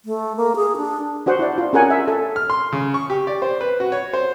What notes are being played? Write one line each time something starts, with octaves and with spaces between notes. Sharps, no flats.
A3
A#3
G#4
D4
D4 F#4 C5 F#5
E4 D5
F4
C#4 G#4 A#4 F#5 G#5
E5
A4
F6
C6
C#3
C#6
G4
D5
C5
B4
F#4
C#5
C5